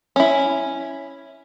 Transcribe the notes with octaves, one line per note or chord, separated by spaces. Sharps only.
C#4 E4